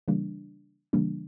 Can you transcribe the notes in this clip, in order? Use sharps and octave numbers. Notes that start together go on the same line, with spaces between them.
C#3 E3 G3 A#3 D4
C#3 E3 G3 A#3 D4